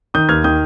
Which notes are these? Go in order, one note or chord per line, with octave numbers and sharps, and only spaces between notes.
D#3 D#6 G6
D#2 F6 G#6
D#3 D#6 G6